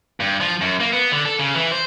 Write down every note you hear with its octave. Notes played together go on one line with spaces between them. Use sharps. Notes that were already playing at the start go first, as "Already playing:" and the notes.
G2
F3
F#2
A#3
B3
D3
A4
C#3
E3
C5